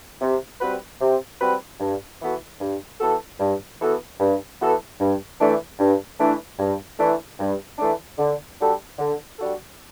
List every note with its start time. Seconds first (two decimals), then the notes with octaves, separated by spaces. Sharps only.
0.21 C3
0.61 G3 C4 F#4 B4
1.01 C3
1.40 G3 C4 F#4 B4
1.80 G2
2.20 E3 B3 F#4 A4
2.61 G2
3.00 E3 B3 F#4 A4
3.40 G2
3.80 E3 B3 F#4 A4
4.20 G2
4.60 E3 B3 F#4 A4
5.00 G2
5.40 E3 A3 D4
5.79 G2
6.19 E3 A3 D4
6.59 G2
6.99 E3 A3 D4
7.39 G2
7.79 E3 A3 D4
8.18 D3
8.59 G3 D4 F#4 A4
8.99 D3
9.39 G3 D4 F#4 A4